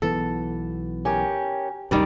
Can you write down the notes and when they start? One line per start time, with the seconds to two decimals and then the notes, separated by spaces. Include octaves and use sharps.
0.02 B1 E3 B3 A4
1.05 C#4 G4 A#4
1.91 C#2 F#2 D#3 G3 D5